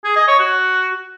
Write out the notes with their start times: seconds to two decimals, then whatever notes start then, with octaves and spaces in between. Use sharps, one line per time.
0.05 G#4
0.16 D#5
0.28 C#5
0.40 F#4